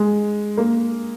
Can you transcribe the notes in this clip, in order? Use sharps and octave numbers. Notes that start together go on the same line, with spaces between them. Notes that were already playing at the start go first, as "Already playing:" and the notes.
Already playing: G#3
A#3